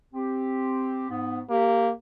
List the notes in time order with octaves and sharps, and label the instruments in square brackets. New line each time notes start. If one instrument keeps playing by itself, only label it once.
[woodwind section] C4 G4
G#2 B3
[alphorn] A#3 [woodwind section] G4